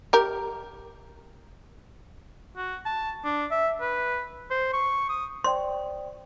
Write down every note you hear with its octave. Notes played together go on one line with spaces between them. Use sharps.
G4 A#4
F#4
A5
D4
E5
B4
C5
C#6
D#6
C5 D5 G5 C6